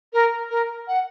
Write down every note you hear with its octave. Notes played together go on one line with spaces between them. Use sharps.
A#4
A#4
F#5